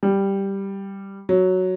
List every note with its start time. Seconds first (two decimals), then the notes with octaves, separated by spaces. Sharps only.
0.03 G3
1.29 F#3